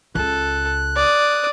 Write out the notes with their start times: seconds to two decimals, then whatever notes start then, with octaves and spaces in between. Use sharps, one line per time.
0.15 C#2 A4 F#6
0.96 D5 D#6